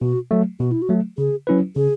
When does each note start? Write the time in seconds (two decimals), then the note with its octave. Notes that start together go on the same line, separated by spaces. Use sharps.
0.01 B2 F#4
0.31 F#3 A3
0.60 B2 F#4
0.71 E4
0.82 F#4
0.89 F#3 A3
1.18 C#3 G#4
1.47 F#3 C#4 E4 B4
1.76 C#3 G#4